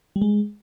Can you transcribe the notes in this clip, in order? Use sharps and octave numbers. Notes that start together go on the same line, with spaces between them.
G3
G#3